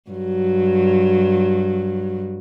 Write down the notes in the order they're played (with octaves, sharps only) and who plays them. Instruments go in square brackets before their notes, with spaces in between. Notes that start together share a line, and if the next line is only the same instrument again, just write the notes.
[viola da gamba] G2 F#3